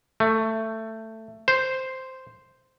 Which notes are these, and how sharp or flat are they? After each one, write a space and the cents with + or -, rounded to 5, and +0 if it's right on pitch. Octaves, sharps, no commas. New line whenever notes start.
A3 +15
C5 -5